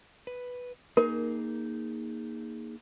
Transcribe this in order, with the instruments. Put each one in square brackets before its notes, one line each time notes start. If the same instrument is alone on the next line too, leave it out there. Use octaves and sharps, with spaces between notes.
[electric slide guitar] B4
[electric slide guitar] A#3 D#4 G#4 [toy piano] A#4